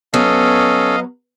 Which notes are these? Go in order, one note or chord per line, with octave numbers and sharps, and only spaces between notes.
F#3 B3 C#4 A4 D#5 F5